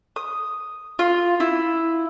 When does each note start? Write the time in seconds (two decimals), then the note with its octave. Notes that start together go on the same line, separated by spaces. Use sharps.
0.16 D#6
0.99 F4
1.40 E4